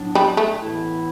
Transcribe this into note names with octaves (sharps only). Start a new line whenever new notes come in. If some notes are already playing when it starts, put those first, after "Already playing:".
Already playing: A2 F#3 B3 D4
G3
A3
A2 E3 B3 E4